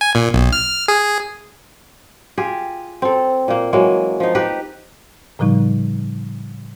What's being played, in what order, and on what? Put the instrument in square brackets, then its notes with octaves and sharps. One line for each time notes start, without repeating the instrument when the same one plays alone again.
[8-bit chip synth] G#5
A#2
B1
F6
G#4
[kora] F4 G4 G#4
C4 A4
A#2 A#3
E3 F#3 G#3 A#3
F3 D#4
D#4 G4 B4
[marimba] A2 C#3 F3 G3 D#4